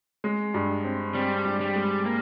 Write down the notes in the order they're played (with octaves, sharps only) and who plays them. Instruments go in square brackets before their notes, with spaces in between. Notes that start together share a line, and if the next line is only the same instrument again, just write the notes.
[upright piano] G#3
G2
C4
[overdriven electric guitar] G3 [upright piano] C4
[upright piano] G2
[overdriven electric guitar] G3
[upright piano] G#3
[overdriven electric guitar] A#3